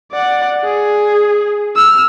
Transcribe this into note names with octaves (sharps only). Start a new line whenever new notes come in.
D5 F#5
G#4
E6 F6